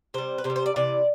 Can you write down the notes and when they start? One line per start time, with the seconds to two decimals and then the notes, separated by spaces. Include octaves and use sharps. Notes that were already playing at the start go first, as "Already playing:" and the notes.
0.14 C3 G3 C5
0.38 B4
0.44 C3 C5
0.50 G3
0.56 C5
0.66 D5
0.76 C3 E3 D5